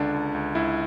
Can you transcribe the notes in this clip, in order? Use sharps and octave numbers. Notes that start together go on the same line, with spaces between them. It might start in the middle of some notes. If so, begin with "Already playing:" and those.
Already playing: C#2 D3 D4
C#2
C#2
C#2 E4